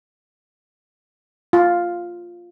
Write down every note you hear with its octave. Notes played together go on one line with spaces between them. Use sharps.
F4